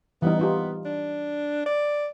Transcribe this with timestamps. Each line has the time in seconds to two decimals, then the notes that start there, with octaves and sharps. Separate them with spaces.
0.22 E3 G3 B3 D#4
0.39 D#4 F4 G4
0.85 D4
1.66 D5